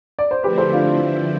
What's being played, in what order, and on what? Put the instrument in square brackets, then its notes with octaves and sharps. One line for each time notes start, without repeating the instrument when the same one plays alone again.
[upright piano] D5
C5
[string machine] D3 F3 A3 C4 E4 [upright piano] G4 B4
[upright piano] A4 C5
D4 F4